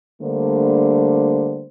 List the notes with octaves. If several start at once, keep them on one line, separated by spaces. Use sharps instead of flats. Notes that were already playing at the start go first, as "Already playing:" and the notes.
D3 G3 A3 A#3 D4 C5